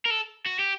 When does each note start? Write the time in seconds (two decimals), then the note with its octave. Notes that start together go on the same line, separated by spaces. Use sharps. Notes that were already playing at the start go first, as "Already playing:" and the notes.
0.06 A#4
0.11 A4
0.46 F#4
0.60 G4